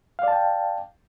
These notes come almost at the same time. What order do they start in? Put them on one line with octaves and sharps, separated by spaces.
F5 D5 A5 G5